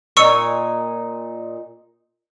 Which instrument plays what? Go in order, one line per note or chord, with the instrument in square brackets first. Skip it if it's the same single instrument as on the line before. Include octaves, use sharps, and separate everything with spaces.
[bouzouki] A#2 D#4 [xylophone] C#6 E6 C#7